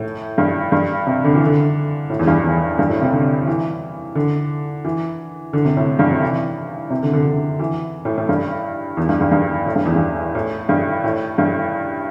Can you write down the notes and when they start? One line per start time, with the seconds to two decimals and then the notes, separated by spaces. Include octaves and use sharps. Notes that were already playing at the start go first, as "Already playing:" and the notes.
Already playing: A2
0.38 G2
0.72 G2
1.07 C3
1.24 D3
1.34 E3
1.46 D3
2.10 A2
2.19 E2
2.27 G2
2.44 E2
2.79 G2
2.90 A2
3.02 C3
3.12 D3
3.47 E3
4.15 D3
4.85 E3
5.53 D3
5.65 C3
5.77 A2
5.99 G2
6.11 C3
6.22 E3
6.90 C3
7.03 D3
7.13 D3
7.25 D3
7.59 E3
8.05 A2
8.17 A2
8.29 G2
8.97 E2
9.09 G2
9.21 G2
9.32 G2
9.66 A2
9.76 G2
9.85 E2
9.96 G2
10.35 A2
10.69 G2
11.04 A2
11.38 G2